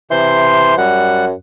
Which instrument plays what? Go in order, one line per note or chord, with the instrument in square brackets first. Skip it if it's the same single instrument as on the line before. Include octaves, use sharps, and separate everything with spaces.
[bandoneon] C3 C5 C6 [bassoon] E3
[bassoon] F#2 [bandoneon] G3 F#5